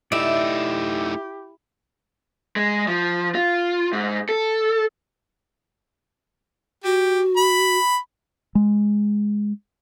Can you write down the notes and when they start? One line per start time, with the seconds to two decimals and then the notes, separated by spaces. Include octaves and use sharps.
0.12 A3 D#4 E4 G4 D5 E5
2.56 G#3
2.88 F3
3.35 F4
3.93 G#2
4.29 A4
6.84 F#4 G4
7.37 B5
8.55 G#3